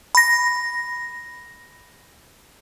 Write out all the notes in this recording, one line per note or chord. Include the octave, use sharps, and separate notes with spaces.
B5 A#6